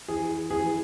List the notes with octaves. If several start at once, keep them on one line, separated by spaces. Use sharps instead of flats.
E3 G#4
E3 G#4